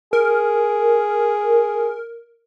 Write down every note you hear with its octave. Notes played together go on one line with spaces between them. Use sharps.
G#4 A#4